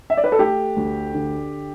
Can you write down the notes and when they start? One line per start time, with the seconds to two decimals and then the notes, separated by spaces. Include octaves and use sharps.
0.10 E5
0.17 D5
0.24 B4
0.32 A4
0.39 A3 G4
0.76 D2
1.14 D3